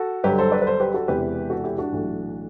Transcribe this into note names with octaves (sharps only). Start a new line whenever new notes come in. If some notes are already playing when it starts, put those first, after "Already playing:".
Already playing: F#4 A4
G1 G2 D3 F#3 G4 B4
A4 C5
B4 D5
B4
A4 C5
G4 B4
F#4 A4
E1 E2 C3 E3 G4 B4
F#4 A4
E4 G4
D4 F#4
B1 A2 E3